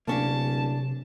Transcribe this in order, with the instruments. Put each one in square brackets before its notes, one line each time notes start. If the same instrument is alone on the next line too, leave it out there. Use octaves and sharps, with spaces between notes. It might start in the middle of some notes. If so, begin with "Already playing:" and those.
[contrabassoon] D1 [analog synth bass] C3 [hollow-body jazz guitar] A#3 C#4 D4 [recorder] A5